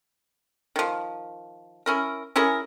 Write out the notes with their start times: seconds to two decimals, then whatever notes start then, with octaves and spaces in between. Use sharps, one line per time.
0.76 D#3 F3
1.86 C#4 E4 A#4
2.36 C#4 E4 G#4 A#4